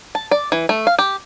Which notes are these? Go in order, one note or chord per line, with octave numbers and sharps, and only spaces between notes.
A5
D5
E3
A3
F5
G4